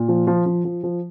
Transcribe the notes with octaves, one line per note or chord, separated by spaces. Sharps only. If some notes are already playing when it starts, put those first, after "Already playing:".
Already playing: A#2
F3
F3
F3
F3
F3